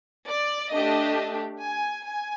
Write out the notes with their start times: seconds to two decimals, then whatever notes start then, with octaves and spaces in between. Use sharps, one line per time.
0.28 D5
0.72 A3 D4 G4 D#5
1.62 G#5
2.06 G#5